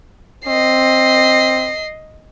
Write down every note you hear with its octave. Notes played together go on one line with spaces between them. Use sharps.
C4 D#5 C7